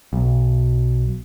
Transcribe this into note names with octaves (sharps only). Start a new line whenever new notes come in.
B1